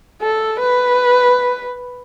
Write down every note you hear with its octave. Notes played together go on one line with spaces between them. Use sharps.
A4
B4